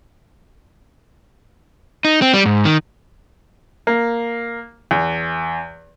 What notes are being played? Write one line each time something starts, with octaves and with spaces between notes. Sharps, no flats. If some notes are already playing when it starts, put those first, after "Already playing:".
D#4
C4
G3
G#2
D#3
A#3
E2